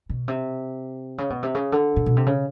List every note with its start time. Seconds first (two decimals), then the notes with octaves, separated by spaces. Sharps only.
0.10 B2
0.28 C3
1.18 C#3
1.30 B2
1.43 C3
1.55 C#3
1.72 D3
1.96 A#2
2.06 B2
2.17 C3
2.26 C#3